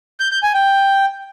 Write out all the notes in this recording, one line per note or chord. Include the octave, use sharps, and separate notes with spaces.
G6
G6
G#5
G5